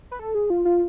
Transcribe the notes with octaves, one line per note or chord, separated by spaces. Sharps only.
B4
A4
G#4
F4
F4